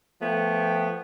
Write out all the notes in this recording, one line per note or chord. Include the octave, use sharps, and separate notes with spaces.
F3 A3 B3 G5